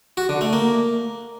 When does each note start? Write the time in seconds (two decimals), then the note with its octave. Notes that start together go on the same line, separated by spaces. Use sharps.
0.17 F#4
0.29 D3
0.41 A3
0.53 A#3